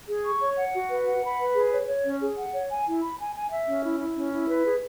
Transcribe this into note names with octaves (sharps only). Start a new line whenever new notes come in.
G#4
C#6
C#5
F#5
F#4
B4
F#5
B5
B4
G#4
C#5
C#5
C#4
G#4
F#5
C#5
G#5
E4
B5
G#5
G#5
E5
C#4
E4
E4
C#4
E4
B4
G#4